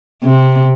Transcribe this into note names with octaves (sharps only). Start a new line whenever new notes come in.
C3